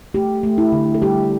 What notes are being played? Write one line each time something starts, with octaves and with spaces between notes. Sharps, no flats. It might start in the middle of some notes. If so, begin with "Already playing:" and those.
A3 G4
A3
E4
D3
A4
G3 G4